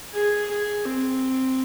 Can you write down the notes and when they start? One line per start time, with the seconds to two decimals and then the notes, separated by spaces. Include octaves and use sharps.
0.13 G#4
0.50 G#4
0.86 C4